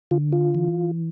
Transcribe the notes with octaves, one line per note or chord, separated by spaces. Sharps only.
D3 F4
F4
E3